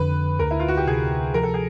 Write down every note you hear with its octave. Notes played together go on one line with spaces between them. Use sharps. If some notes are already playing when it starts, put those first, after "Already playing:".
Already playing: F2 D3 B4
D2 A#4
E4
F4
F#4
G4
C3 G#4
F3 A#4
A4
G#4